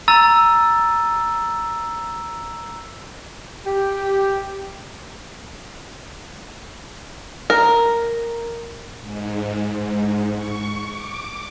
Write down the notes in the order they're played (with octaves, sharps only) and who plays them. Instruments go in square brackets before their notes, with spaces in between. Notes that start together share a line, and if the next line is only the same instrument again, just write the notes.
[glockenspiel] A#5 E6 A6 D#7
[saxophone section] G4
[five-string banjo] A#4
[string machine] G#2
G#2
C#6
D6